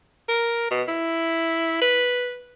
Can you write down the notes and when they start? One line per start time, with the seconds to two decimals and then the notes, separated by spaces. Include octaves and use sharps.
0.29 A#4
0.71 B2
0.88 E4
1.81 B4